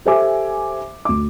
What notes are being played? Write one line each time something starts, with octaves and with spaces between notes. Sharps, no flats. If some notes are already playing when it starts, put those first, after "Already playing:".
G4 A4 C5 E5 G#5 D6
D2 D6